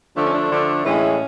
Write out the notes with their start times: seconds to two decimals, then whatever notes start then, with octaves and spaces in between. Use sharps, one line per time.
0.14 D3 F3 A3 D4
0.24 C#4
0.33 D4
0.50 D3 F3 A3
0.85 A2 E3 G#3 C#4